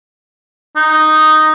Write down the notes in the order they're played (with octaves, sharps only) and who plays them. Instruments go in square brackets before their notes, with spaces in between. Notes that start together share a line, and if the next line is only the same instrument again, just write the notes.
[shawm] D#4